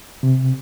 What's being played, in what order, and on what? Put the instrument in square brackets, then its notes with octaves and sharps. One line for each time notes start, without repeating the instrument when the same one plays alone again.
[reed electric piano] C3